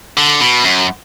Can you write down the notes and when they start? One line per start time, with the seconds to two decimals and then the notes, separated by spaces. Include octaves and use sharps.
0.17 D3
0.41 B2
0.64 F#2